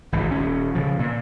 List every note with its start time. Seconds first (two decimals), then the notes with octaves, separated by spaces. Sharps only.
0.12 G#1 C#2 E3
0.31 D#1 C#4
0.75 C#3 F3
0.99 A#2